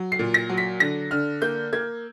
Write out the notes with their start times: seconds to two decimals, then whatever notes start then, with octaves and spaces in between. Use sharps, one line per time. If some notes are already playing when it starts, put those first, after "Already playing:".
Already playing: F#3
0.12 C7
0.19 A#2
0.34 A#6
0.49 F#3
0.58 B6
0.80 D3 A#6
1.11 D3 F6
1.42 A#3 G6
1.73 A#3 G#6